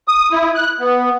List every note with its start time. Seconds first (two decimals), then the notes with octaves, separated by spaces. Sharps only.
0.08 D#6
0.32 E4
0.55 F#6
0.80 B3